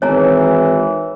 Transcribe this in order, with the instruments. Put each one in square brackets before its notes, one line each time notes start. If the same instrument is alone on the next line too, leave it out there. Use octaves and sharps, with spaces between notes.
[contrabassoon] G#1 [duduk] E3 [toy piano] C#5 G#5 A#5